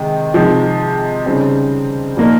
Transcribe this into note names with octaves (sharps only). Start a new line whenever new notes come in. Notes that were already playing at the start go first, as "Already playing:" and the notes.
Already playing: C3 D#3 G#3
C3 F3 G#3 D#4
C#3 G3 C4 D#4
A#2 F3 A#3 D#4